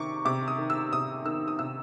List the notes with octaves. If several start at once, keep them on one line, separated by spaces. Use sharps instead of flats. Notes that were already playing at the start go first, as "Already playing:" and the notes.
Already playing: C3 D#3 C#6 D6
C3 D6
D#6
D#3
E6
C3 D#6
D#3 E6
D#6
C3 E6